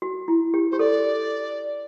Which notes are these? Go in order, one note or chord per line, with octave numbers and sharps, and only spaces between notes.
F#4
E4
G4
G4 C5
A4 D5